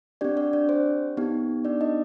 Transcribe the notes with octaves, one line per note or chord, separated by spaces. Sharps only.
C4 D4 G4 D5
D4 D5
D4 D5
C5
B3 D#4 G4
D4 D5
D#4 D#5